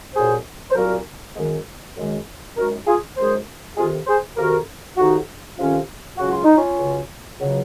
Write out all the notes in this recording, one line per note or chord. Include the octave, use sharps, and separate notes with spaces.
C2 A#2 F#3 G#4 C5
C5
C2 A#2 F#3 F#4 A#4
F#2 D#3 G#3
F#2 D#3 G#3
F#2 D#3 G#3 F#4 A#4
F4 G#4
F#2 D#3 G#3 G#4 C5
F2 C3 D#3 F4 G#4
G#4 C5
F2 C3 D#3 F#4 A#4
F2 C3 D#3 D#4 F#4
F2 C3 D#3 C#4 F4
C#2 C#3 F#3 F#4
F4
D#4
C#4 F4
C#2 C#3 F#3
C#2 C#3 F#3